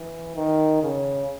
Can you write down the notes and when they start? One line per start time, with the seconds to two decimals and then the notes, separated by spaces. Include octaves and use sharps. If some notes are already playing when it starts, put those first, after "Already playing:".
Already playing: E3
0.36 D#3
0.83 C#3